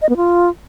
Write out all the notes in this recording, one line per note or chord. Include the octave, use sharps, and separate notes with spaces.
D#5
B3
F4